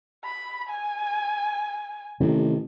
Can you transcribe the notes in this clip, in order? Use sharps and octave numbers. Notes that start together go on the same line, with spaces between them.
B5
G#5
A1 C3 D#3